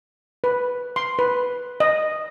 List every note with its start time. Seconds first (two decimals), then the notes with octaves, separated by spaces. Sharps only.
0.44 B4
0.96 C6
1.19 B4
1.80 D#5